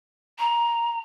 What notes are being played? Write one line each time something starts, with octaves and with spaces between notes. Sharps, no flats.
A#5